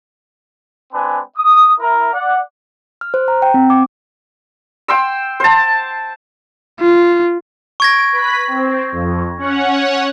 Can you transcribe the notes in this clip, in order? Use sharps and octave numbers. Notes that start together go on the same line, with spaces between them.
G#3 C4 D4 B4 G#5
D#6
E4 A#4
D5 F#5
F6
C5
A#5
G5
C4
D6
G5 C6 E6
C5 A5
F4
C#6 G#6 A#6 D7
B4 B5 B6
C4
F2
C#4 C#5 F#5